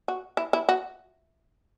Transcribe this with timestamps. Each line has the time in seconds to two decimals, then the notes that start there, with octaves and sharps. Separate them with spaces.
0.08 F#4
0.37 E4
0.53 E4
0.69 F#4